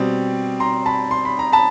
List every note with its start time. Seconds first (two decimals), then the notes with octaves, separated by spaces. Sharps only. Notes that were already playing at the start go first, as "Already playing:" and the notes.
Already playing: B2 G3 C4
0.60 A#5 C6
0.86 A5 B5
1.11 C6
1.25 B5
1.39 A#5
1.52 A5 B5